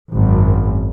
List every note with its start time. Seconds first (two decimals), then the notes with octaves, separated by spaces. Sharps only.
0.12 G#1 F#2